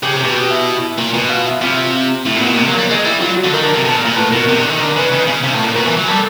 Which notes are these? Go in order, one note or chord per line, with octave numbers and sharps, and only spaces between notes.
C#3 G4
C3
G4
B2
G4
E4
A#2
B2
F4
E4
C3 F4
A2 E4
A#2 B3
B2
C3 A#3
F#3
A#3
G3
G#3 D#4
G3 E4
F#3 F4
F#4
D3
D#3 A#4
D3
A#4
C3
B2 A4
A#2
A#4
A#2
A2 B4
B2 A#4
C3
D3
D#3
D3 A#4
C#3 B4
D#3
C#3
C3
A2
A#2
B2 A#4
E3
F#3
G3 A4